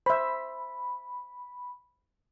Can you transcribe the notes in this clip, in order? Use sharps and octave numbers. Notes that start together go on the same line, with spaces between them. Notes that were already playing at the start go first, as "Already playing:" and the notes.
C5 E5 B5